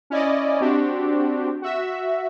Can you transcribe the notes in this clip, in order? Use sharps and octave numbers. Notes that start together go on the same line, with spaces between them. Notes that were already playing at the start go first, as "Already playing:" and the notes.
C#4 E4 D5 D#5
C4 D4 F#4 G4
F#4 E5